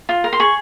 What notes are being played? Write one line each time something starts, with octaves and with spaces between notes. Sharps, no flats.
F4
A#4
C6
G#4 C#6